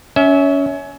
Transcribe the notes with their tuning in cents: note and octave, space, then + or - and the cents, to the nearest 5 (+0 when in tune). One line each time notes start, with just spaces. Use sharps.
C#4 +20 E5 -25